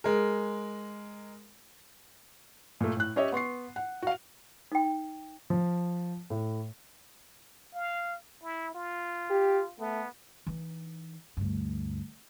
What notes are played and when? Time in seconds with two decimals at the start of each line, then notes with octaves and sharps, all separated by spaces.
0.04 G#3 A#4
2.81 A#2 A3
2.97 A2 F#6
3.16 C#4 G4 C#5 D#5 E5
3.32 B3 C6 C#6 C7
3.76 F#5
4.02 F#4 F5
4.72 D#4 G5
5.50 F3
6.30 A2
7.75 F5
8.43 E4
8.75 F4
9.30 G4
9.80 A3 B3
10.47 E3 D#4
11.37 D2 G2